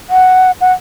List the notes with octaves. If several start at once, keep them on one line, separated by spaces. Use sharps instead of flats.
F#5
F#5